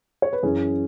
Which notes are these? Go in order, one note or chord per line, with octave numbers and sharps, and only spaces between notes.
C#5
B4
F#2 E3 C#4 G#4